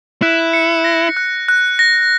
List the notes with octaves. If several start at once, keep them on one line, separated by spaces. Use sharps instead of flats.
E4 F#6
C#7
A#6
F#6
F#6
A#6